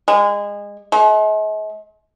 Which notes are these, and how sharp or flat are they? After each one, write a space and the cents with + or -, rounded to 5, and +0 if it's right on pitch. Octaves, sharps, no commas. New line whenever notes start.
G#3 -25
G#3 +45